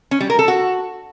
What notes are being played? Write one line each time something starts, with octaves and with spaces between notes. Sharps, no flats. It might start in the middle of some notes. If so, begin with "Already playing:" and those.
C#4
G3
A#4
A4
F#4